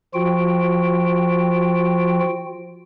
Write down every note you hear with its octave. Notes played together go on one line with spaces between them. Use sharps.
F3 F4 F#4 G5